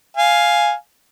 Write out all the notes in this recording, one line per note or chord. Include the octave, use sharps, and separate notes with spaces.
F5 G#5